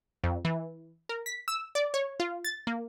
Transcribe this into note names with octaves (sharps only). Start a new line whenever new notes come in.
F2
E3
A#4
B6
E6
D5
C#5
F4
A6
A#3